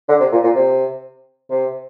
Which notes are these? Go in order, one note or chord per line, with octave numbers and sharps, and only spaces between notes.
D3
C3
A#2
A#2
C3
C3